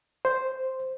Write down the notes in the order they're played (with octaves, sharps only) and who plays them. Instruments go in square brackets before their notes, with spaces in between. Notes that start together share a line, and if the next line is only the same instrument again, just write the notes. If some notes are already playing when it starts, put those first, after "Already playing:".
[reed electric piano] C5